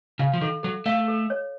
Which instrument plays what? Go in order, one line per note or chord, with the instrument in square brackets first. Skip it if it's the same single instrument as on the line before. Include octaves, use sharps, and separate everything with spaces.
[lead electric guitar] C#3 [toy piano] F5
[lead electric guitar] F3
[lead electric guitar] D#3 [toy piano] A4
[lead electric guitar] F#3 [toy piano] A4
[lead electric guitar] A3 [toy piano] F5
[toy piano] A4
C#5